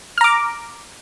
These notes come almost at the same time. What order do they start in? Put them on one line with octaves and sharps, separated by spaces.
F6 A#5 D6